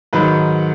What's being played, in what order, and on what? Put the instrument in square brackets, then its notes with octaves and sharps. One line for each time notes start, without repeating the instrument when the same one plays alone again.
[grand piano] G#2 D#3 F#3 B4